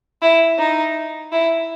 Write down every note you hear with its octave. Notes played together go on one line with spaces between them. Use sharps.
E4
D#4
E4